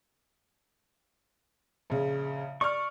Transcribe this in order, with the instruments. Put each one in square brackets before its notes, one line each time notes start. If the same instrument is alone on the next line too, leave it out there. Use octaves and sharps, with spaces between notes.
[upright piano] A#1 C#3
[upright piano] D5 F6 [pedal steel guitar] C#6